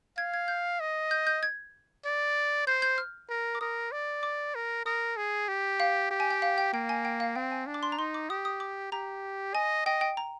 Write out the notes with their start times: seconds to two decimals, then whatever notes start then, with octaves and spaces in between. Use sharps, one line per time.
0.17 F5 G#6
0.34 G#6
0.48 G6
0.80 D#5
1.11 G6
1.27 G6
1.43 G#6
2.05 D5
2.67 C5 G6
2.82 G6
2.98 F6
3.30 A#4
3.55 D6
3.61 A#4 D#6
3.92 D5
4.23 D6
4.55 A#4
4.86 A#4 D#6
5.17 G#4
5.48 G4
5.80 F5
6.11 G4
6.20 G#5
6.31 G5
6.42 F5
6.58 G5
6.73 A#3 G5
6.89 G#5
7.05 G5
7.20 F5
7.36 C4 G5
7.51 G#5
7.66 D4
7.74 D6
7.83 C6
7.92 A#5
7.98 D#4 C6
8.14 D6
8.30 G4 D#6
8.45 D#6
8.60 D6
8.92 G4 A#5
9.55 D#5 G#5
9.86 D#5 G5
10.01 G5
10.17 A#5